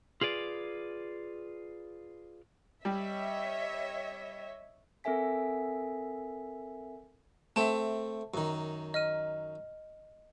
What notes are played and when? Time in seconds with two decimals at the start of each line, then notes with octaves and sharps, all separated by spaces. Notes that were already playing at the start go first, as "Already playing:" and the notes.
0.21 F4 G#4 B4 D5
2.85 G3 C#5 D#5 E5
5.04 C4 A4 A#4 E5 G#5 B6
7.56 A3 C4 E5 G5 A5
8.34 F#2 D#3
8.94 D#5 F6 D#7